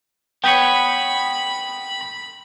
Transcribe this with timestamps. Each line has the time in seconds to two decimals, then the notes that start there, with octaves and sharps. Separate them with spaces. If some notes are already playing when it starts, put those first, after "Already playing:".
0.44 B3 B4 C#5 G5 B5